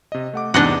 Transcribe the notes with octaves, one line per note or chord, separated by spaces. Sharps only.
C3 D#5
A3 F#5 D6
E2 G#2 C3 D4 D#5 F#5